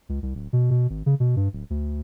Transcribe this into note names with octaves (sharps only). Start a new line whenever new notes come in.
C#2
C2
D1
B2
B2
G#1
C#3
B2
G2
D1
D2